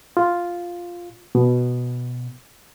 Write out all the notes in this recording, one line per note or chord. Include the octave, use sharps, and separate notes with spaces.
F4
B2